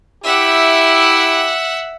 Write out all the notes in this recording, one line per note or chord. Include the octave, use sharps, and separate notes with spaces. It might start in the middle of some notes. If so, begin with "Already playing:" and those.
E4 G4 E5 F#5